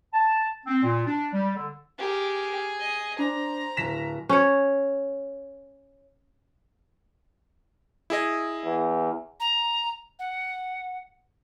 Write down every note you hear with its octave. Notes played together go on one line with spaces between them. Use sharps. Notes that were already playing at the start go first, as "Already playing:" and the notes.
A5
C4
A#2
D4
G3
D3
G4 G#4 A#4
D#5
D4 C5 A#5
D1 B6 E7
C#4 C#5
E4 G#4 D#5
E2
A#5
F#5